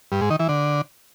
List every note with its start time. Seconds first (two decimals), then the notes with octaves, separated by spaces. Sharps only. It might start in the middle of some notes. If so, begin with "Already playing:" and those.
0.12 G2
0.21 G#2
0.30 D#3
0.39 E3
0.49 D3